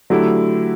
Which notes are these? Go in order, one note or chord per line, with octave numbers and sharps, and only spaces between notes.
D3 F#3 A3 E4 G4